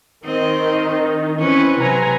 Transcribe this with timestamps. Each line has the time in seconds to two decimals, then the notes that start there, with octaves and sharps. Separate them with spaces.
0.24 D#3 C4 D#4 D#5
1.39 E3 C4 C#4 B4
1.78 C3 F#3 B4 G#5 A#5